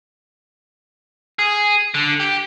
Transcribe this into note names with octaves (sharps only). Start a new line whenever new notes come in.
G#4
D3
G4